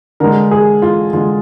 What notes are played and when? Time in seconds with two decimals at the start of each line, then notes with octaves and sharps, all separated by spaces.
0.20 D3 G#3 A#4
0.51 G#4
0.82 F4
1.13 D3 G#3 F4